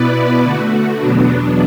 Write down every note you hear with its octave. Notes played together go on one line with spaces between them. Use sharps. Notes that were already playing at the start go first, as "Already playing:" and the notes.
Already playing: B2 B3 E4 B4 D5
D3 A3 F#4
E2 B2 F#3 B3 D4